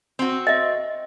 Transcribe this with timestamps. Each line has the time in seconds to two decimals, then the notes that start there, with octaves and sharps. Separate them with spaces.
0.19 C4 F#4
0.47 D#5 E5